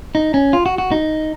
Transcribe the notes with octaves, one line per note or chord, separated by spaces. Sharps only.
D#4
C#4
F4
F#4
F#4
D#4